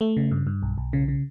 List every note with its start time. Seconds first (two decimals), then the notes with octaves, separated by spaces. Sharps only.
0.01 A3
0.17 C#3
0.31 G2
0.47 G2
0.62 B1
0.78 B1
0.93 C#3
1.08 C#3